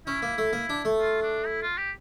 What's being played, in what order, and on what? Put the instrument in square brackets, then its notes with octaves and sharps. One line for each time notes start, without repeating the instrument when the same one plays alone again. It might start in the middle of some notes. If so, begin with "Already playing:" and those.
[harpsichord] C#4 [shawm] E4
[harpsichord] A#3
A3
A#3
D4
A3
[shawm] F4
D4
E4
F4
G4